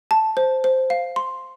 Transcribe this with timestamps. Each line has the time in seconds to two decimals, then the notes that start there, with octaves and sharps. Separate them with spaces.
0.11 A5
0.37 C5
0.64 C5
0.90 F5
1.16 C6